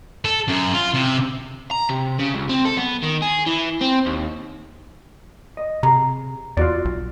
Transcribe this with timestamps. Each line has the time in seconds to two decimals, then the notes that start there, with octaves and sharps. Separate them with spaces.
0.25 A4
0.48 F#2
0.73 F4
0.94 C3
1.71 A#5
1.89 C3
2.19 C#3
2.34 C#2
2.49 C4
2.65 A4
2.78 B3
3.03 D#3
3.22 G#4
3.46 E3
3.81 C4
4.06 D#2
5.57 D#5
5.83 C3 G#4 A#5
6.57 E2 F4 F#4 D5
6.85 B1